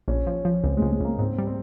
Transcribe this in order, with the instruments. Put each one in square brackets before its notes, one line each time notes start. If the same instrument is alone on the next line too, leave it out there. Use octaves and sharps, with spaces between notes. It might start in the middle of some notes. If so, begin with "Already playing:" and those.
[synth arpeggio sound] A#1 [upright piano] C#4
[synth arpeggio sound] F3
F3
[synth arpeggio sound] C#2 [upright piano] C4
[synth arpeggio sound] C#2 [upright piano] G#3
[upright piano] G#3
[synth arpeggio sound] C#2 [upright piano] A#3
[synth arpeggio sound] G#2 [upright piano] C4
[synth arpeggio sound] G3
[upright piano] C4